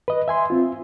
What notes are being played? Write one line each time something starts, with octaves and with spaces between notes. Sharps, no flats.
B4 D#5
E5 G#5 C6
C4 F4